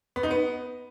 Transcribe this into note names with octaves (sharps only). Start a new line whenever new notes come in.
B3
D#4
B3